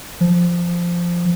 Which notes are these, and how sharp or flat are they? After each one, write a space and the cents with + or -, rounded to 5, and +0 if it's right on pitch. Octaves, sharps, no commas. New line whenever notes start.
F3 -5